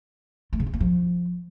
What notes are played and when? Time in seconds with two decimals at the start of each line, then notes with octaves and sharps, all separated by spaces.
0.53 A3
0.60 C#3
0.67 A3
0.73 A#3
0.80 F3